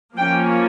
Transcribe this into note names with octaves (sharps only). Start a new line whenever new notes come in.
F3 A#3 C#4 G5